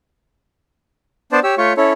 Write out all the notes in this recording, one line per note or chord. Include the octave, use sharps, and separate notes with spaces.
B3 D4 C5 D5 A5
G4 C#5 E6
A3 F4 C#5 C#6
C#4 E4 A4 C#5